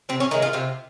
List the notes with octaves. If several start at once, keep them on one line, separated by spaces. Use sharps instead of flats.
C3 C4
C#4
D#3 G#3 D#4
F4
C3 F4